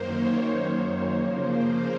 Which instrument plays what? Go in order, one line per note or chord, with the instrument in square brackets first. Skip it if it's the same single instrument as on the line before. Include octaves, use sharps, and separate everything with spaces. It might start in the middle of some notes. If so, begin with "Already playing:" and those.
Already playing: [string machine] F#2 D#3 A#3 C5
C#5
C5
C#3 F3 A#3 C5